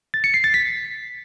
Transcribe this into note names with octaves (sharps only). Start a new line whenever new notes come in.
A6
C#7
C7
A6
B6